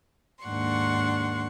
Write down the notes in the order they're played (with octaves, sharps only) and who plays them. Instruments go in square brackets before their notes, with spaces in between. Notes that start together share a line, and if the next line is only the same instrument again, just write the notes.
[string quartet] D#2 G#2 D4 F#5 C6 C#6